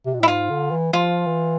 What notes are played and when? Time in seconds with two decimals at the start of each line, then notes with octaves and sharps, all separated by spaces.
0.06 C3
0.14 B2
0.20 A2
0.23 E4
0.28 G#2 F4
0.50 D3
0.71 E3
0.93 F3 F4
1.26 E3